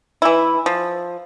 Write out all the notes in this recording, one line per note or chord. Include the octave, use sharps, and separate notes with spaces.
E3 E4
F3